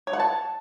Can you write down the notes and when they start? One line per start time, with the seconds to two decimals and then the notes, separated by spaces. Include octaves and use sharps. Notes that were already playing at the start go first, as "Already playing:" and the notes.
0.07 C#5
0.13 F#5
0.20 A5